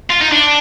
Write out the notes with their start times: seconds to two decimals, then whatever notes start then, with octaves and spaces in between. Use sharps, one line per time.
0.10 F4
0.22 D#4
0.32 D4